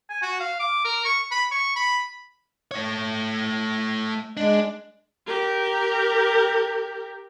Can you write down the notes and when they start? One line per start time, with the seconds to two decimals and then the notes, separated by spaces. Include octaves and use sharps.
0.09 G#5
0.22 F#4
0.40 F5
0.60 D6
0.85 A#4
1.05 C#6
1.31 B5
1.51 C#6
1.76 B5
2.71 A3 C#5
4.37 G#3 D4
5.26 G4 A#4